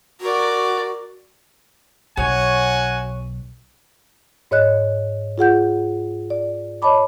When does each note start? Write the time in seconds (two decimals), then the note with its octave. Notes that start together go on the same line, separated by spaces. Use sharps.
0.21 F#4 A#4 D5
2.17 B1 F#4 C#5 F#5 G#5
4.51 G#2 C#5 D#5 F#6
5.38 F4 G#4 F#5 G6
6.30 D5
6.82 C#5 D#5 A5 B5 D6